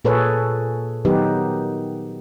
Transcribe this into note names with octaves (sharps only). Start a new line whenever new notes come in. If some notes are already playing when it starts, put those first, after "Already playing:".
A#2 G#4 A4 B4 C#5
D#3 F#3 B3 D#4 G4 B4